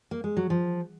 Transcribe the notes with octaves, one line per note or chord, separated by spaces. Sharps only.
A#3
G#3
F#3
F3